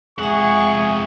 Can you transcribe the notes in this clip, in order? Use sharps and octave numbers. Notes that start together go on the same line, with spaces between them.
F2 G#3 G#4 E5 F#5 C#6